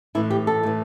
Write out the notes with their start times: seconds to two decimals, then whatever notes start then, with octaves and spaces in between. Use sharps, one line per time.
0.15 A2 E3 E4
0.30 G4
0.47 A4
0.63 A2 E3